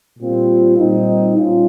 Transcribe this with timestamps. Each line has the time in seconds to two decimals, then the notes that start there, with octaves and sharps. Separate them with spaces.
0.18 A#2 G3 C4 F4
0.77 A#2 G3 C4 D#4
1.36 G3 C#4 F4